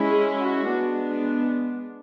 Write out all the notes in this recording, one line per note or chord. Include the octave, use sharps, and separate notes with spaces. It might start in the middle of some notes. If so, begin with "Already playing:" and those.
Already playing: G#3 C#4 E4
G#4
F#4
G#3 B3 D4